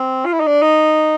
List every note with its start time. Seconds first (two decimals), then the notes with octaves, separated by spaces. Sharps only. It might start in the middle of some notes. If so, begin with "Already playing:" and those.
Already playing: C4
0.25 F4
0.33 E4
0.40 D#4
0.47 D4
0.62 D#4